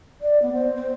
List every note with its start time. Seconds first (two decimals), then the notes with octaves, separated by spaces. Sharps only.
0.21 D5
0.42 B3
0.54 C5
0.75 C5